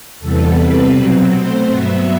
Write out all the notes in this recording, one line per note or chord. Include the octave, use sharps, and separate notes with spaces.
E2 C3 E3 G3 B3 A4
C3 G3 C4 B4
B2 F#3 C4
B2 A3 C4 C5
G2 F#3 B3 E5